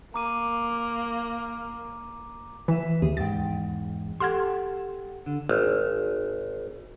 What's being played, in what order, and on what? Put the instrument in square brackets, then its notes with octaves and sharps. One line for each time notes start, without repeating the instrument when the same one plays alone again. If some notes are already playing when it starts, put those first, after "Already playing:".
[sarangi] A#3 [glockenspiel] A#5 D6 D#7
[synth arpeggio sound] E3 [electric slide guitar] B4 E5
[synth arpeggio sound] D#2 [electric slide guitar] G#4
[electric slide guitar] E2 G#2 G5 [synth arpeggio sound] A6
[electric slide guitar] G4 A4 F#5 [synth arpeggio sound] C6 F6 G#6
[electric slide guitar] D3
[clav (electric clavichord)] G#1